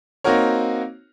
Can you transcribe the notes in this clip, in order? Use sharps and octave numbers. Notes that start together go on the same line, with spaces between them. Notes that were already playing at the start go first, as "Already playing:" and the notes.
A#3 C4 D#4 F#4 A#4 C#5